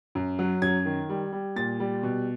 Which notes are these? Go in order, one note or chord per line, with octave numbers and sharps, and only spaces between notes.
F#2
F#3
F#2 G#6
D#3
G3
G3
A#2 A6
G3
B2